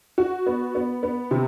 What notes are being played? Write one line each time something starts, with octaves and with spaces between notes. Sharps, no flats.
F#4
B3
B3
B3
C3